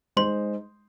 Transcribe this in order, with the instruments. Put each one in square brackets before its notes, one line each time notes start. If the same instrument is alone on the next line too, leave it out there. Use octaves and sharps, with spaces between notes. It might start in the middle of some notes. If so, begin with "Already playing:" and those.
[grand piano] G#3 D#4 C5 D#5 [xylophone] C6